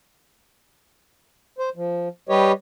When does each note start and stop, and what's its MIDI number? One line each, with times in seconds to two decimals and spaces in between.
1.59 1.69 72
1.76 2.08 53
2.29 2.52 55
2.29 2.52 67
2.29 2.52 71
2.29 2.52 73
2.29 2.52 75